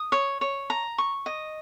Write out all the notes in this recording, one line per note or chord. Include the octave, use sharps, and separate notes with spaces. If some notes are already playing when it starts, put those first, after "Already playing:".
Already playing: D#6
C#5
C#5
A#5
C#6
D#5